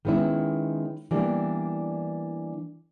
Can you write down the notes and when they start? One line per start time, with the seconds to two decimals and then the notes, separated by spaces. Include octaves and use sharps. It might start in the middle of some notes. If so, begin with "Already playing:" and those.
0.05 D#3 G#3 B3 C#4 E4
1.11 E3 G3 A#3 B3 D4